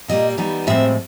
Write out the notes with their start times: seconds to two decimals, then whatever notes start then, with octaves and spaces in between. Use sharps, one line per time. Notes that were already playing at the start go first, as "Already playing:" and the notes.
0.08 A#2 G3 A#3 D#5
0.37 E3 G3 B3 D#4
0.67 A2 F3 G#3 C4 E5